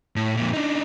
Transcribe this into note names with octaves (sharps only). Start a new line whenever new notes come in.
A2
F2 A#2
D4 D#4